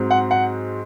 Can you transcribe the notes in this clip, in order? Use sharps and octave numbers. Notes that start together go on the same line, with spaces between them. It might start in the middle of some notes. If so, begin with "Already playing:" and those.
Already playing: G#2 F#3 C4
F#5
F#5